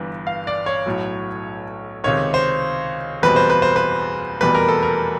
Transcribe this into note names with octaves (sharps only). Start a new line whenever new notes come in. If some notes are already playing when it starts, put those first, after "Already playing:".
Already playing: G1 G2 E3
F5
D5
C#5
B1 A2 F#3
C#2 C3 D#3 C#5
C5
F#1 E2 B2 G3 C4 B4
C5
B4
C5
B4
F1 E2 B2 G3 B4
A#4
A4
A#4